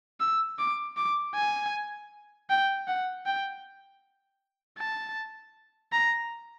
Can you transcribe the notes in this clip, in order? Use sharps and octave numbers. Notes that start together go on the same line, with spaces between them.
E6
D6
D6
G#5
G5
F#5
G5
A5
A#5